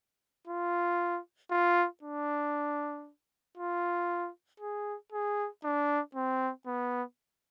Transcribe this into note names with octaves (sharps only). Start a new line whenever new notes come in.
F4
F4
D4
F4
G#4
G#4
D4
C4
B3